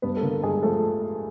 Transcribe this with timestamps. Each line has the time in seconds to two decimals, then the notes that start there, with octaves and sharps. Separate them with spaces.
0.02 G2 B3 B4
0.17 A4
0.22 D3 A#3 A#4
0.42 G2 G#3 G#4
0.62 F3 A3 A4